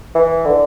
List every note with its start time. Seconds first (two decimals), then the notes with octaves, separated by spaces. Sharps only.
0.15 E3
0.46 D3